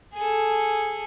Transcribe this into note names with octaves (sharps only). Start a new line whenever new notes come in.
G#4 A4